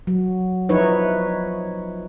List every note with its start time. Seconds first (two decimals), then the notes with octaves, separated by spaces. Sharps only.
0.07 F#3
0.69 F3 D#4 E4 B4 C#5